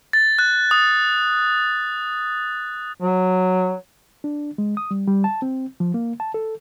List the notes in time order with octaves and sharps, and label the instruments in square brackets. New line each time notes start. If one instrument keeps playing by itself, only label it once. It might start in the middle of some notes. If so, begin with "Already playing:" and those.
[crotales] A6
F#6
D#6
[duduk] F#3
[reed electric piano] D4
G#3
D#6
G3
G3
A5
C4
F3
A#3
A5
A4